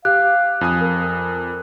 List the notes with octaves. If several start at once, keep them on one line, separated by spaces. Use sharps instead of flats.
G4 F5 F#6
F2 G#5 D#6
A#4